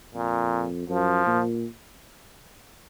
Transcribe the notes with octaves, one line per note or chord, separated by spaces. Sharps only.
F2 A#2
F#2 F3
A#2